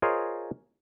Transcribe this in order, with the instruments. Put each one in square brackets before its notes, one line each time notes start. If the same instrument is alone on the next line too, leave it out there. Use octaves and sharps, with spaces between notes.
[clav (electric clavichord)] F4 G#4 A#4 C5 C#5 D#5